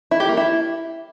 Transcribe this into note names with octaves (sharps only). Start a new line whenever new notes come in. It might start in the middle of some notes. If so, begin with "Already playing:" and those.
E4
G4
A#3
E4